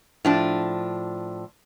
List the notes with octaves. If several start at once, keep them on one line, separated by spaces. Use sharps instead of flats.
A2 F3 D4